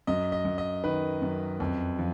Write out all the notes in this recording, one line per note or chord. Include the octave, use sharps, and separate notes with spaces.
F#2 D#5
D#5
F#2
D#5
D#3 B4
F#2
F2
F3